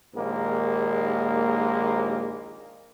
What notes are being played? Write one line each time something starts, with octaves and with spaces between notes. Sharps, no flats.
A#1 D#2 G#3 A#3